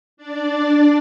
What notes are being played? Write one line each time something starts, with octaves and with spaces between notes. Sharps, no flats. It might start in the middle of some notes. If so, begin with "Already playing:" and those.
D4 D5